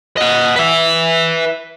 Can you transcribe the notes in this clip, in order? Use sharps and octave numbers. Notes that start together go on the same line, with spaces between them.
D#5 F#5
B4 E5